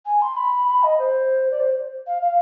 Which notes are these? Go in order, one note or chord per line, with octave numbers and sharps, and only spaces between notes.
G#5
C6
B5
B5
D#5
C5
D5
C5
F5
F5